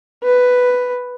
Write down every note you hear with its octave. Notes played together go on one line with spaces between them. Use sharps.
B4